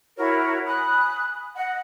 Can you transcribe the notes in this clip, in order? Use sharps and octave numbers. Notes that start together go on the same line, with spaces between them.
E4 F#4 A#4 C#5
G#5 B5 D#6 F#6
D#5 F#5